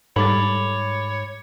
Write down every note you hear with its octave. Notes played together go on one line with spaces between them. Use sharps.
G#2 G3 A4 C#5 B5 D6 A6